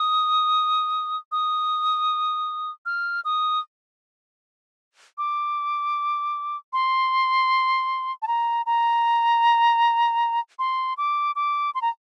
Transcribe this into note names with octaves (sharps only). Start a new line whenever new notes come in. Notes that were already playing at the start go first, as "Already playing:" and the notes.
Already playing: D#6
D#6
F6
D#6
D6
C6
A5
A#5
A#5
C6
D6
D6
C6
A#5